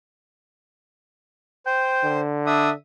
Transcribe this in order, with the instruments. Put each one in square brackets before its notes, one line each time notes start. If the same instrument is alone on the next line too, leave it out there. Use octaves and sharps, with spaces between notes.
[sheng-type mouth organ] C5 [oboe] G5
[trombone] D3
[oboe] D4 [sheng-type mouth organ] E5 D#6